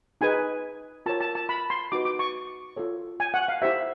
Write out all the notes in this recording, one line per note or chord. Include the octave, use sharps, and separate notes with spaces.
D#4 G#4 B4 G#5
F4 A#4 C#5 A5
A5
A5
B5
C6
D#4 F#4 B4 D6
D6
C#6
F4 A4 C#5
G#5
F#5
F5
E4 G4 C5 E5